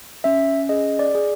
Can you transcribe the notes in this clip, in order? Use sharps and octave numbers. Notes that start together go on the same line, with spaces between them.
C#4 E5
G#4 D#5
D5
G#4